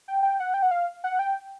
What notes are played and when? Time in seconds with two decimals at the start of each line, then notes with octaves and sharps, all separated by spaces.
0.08 G5
0.23 G5
0.40 F#5
0.54 G5
0.63 F#5
0.71 F5
1.04 F#5
1.19 G5